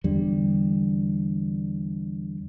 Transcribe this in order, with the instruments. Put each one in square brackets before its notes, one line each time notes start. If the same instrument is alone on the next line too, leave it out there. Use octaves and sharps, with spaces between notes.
[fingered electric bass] E2 D3 G3